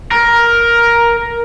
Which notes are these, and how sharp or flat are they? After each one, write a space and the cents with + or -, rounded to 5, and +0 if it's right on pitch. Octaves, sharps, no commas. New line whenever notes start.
A#4 +10